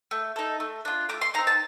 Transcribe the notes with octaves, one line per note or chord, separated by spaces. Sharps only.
A3
D#4 A4
A3
D4 F4
A3 D6
C6
C4 D#4 A#5
A5